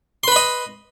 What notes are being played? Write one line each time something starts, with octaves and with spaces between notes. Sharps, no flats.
B4 D#5 B5 C6